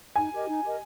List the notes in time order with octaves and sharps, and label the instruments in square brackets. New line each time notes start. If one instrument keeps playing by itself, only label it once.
[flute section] D#4 [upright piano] G#5
[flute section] G4 A#4 D#5
D#4
G4 A#4 D#5